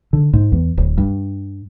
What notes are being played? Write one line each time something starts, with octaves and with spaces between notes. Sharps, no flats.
D3
G#2
E2
D1
G2